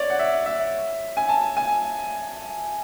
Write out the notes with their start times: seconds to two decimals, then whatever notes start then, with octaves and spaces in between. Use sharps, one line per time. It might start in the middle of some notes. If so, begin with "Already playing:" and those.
Already playing: C#5 D5
0.10 F#5
0.19 E5
0.46 E5
1.17 G#5
1.29 A5
1.57 G#5